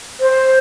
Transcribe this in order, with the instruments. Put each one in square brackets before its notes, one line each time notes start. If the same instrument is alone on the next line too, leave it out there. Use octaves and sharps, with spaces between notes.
[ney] C5